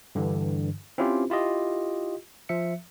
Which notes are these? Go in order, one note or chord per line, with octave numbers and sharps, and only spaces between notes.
G2 D3 E3
C4 C#4 E4 F4 G4 C5
E4 F4 G4 D#5
F3 E5 C#7